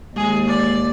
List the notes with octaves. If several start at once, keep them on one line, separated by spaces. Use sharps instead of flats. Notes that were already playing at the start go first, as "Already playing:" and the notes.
D#2 G#3 G#4
D5